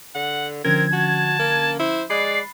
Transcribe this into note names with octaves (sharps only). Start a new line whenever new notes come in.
D3 F#5
D3 F3 C4 C#4 A#4 G#6
F#4 A5
A#3
E4 C5
G#3 D5 B5 F#6 A6 C7